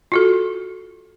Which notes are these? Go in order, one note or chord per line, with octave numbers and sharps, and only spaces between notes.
F4 F#4 A4